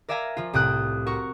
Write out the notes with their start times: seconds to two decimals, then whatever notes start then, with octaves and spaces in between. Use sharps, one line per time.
0.09 A#4 D5 E5 F5 G#5 A#5
0.37 F3 F4
0.53 C2 A2 G5 D#6 F#6
1.07 F#4 A#4 C#6